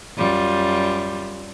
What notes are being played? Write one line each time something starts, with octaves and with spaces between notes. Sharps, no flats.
F#2 G3 F4